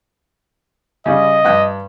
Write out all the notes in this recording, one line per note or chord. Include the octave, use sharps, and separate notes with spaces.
C#3 G3 D#5
G2 G5 F#6